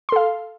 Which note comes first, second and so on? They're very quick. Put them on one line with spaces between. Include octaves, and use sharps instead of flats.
C6 A4 F5